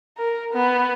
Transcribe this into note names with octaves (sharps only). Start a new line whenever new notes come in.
A#4
B3